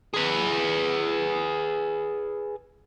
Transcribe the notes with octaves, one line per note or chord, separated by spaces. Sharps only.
G#4 B4